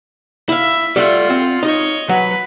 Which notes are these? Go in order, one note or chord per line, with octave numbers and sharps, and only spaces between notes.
E4 E5 F5
G3 A3 F4 F#5
C4
D#4 C#5 D#5
F#3 B4